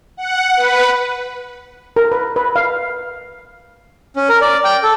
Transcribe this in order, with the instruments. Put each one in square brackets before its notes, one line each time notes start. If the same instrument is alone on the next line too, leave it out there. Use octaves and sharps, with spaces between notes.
[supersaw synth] F#5
B4
[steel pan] A#4
B4
B4
F5
[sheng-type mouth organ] C#4
A#4
D5
G5
A4